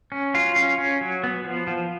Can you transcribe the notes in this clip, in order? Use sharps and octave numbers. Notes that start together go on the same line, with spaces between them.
C#4
F#3 F4
C#4
C#4
F#3
B3
F3
F3